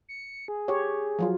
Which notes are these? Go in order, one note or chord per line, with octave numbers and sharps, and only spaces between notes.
C#7
G#4
G4 C#5
F3 F#3 F4